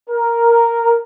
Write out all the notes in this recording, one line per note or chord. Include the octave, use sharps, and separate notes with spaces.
A#4